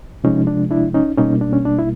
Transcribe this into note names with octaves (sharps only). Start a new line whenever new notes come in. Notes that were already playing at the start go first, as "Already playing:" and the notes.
C3 F3 G#3 C#4 D#4
D4
D4 E4
C#4 D#4
B2 G3 A#3 C#4 D#4
D4
C#4
D4
E4